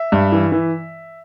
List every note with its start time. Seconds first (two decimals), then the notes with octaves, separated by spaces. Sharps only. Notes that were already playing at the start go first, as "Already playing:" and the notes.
Already playing: E5
0.12 G2
0.32 E3
0.52 E3